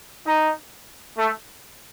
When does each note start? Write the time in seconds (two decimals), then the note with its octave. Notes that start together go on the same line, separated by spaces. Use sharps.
0.26 D#4
1.17 A3